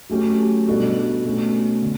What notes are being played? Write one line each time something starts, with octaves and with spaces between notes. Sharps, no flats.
F#3 A3 C#4 G4
B2 G3 D4 F#4 A4
B2 A3 C#4
D3